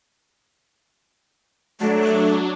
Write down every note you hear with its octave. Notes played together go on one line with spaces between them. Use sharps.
F#3 A3 D4